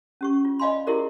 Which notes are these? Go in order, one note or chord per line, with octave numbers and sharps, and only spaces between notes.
C#4 G4 C#6
F4
D5 D#5 F5 G#5 B5 C6
E4 F4 G4 G#4 A#4 D5